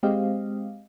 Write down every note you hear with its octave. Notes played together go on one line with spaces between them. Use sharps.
G#3 C4 G4 D#5 F5